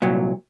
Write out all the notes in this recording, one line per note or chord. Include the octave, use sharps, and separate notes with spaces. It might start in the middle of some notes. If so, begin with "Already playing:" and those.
C2 A#2 F#3